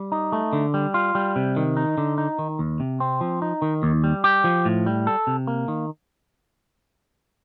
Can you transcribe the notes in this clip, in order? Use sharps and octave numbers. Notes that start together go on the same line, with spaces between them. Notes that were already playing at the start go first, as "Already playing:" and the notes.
Already playing: G3
D#4
A3
D3
G3
F4
G3
C3
D#3
D#4
D3
D#4
D#3
D#2
C3
C4
F3
D#4
D#3
D#2
G3
G4
F3
A2
G3
A4
C3
A#3
D#3